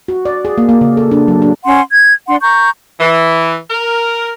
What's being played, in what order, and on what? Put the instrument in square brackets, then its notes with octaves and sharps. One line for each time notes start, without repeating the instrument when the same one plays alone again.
[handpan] F#4
D5
G#4
A#3
A#3
C#3
A4
D4
F#3
D4
[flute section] C#4 F#5 C6
G#6
D4 F#5 C6
A#5 C#6 G6
[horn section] E3
A#4